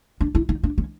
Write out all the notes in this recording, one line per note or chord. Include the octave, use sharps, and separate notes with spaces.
D4
E4
D#4
D4
C#4